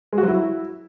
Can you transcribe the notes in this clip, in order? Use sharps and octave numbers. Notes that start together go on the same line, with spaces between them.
G#3
F#4
F#3
E4